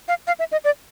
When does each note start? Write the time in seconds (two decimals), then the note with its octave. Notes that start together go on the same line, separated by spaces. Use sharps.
0.08 F5
0.27 F5
0.39 E5
0.52 D#5
0.65 D5